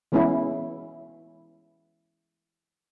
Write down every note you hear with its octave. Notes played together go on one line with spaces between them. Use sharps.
E3 G#3 B3 C#4 E4